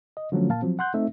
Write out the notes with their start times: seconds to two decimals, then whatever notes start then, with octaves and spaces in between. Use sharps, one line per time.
0.17 D#5
0.32 D3 F3 F#3 A3 C#4
0.49 A#2 A#3 F5 A5
0.62 F3 F#3 C4
0.79 F#5 C6 F#6 G6
0.94 A3 C4 D#4 E5